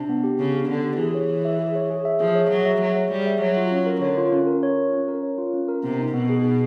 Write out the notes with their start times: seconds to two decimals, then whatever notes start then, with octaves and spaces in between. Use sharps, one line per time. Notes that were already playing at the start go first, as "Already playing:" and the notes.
Already playing: C3 D4
0.09 B3
0.24 G4
0.39 C#3 B3
0.55 D4
0.69 D3 B3
0.84 G4
0.99 E3 G#4
1.15 C#5
1.30 G#4
1.45 E5
1.59 G#4
1.75 C#5
1.90 G#4
2.05 E5
2.20 F3 G#4
2.35 C#5
2.51 F#3 G#4
2.66 E5
2.81 F#3 G#4
2.96 C#5
3.12 G3 G#4
3.26 E5
3.41 F#3 C#5
3.57 F4
3.72 C#4
3.86 A#4
4.02 D3 C#5
4.17 F4
4.32 C#4
4.47 A#4
4.63 C#5
4.78 F4
4.93 C#4
5.08 A#4
5.23 C#5
5.38 F4
5.54 C#4
5.69 A#4
5.83 C3 B3
5.98 D#4
6.14 B2 B3
6.29 G#4
6.44 B3